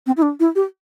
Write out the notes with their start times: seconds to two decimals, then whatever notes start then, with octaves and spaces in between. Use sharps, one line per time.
0.06 C4
0.17 E4
0.22 D4
0.40 E4
0.55 G4